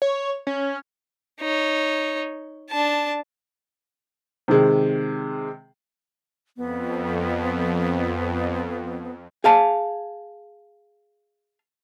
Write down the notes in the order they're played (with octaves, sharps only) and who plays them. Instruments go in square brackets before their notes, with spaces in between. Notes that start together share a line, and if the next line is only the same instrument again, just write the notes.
[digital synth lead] C#5
C#4
[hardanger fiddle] D#4 C#5
D4 A5
[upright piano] C3 D#3 G#3
[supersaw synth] F2 [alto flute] B3
[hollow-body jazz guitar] G#4 F5 A5